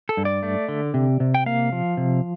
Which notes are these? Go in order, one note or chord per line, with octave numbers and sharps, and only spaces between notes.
A4
G2
D5
A3
D3
C3
C3
G5
A#3 F5
F3
C3